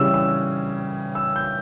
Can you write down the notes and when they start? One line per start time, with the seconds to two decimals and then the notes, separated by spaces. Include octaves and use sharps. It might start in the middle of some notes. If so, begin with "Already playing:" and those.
Already playing: C#3 E3 G3 C#4 E6
0.14 E6
1.15 E6
1.36 G6